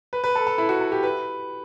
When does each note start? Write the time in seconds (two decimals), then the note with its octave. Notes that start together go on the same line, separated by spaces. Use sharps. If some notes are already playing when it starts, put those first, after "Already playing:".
0.13 B4
0.24 B4
0.35 A4
0.47 A4
0.58 E4
0.69 F#4
0.81 A4
0.92 G4
1.03 B4